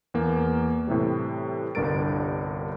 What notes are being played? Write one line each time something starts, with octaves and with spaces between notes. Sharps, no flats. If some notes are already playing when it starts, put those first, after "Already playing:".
E2 A#3
A2 C3 E3 G3
G1 C2 G2 A#4 A6 D7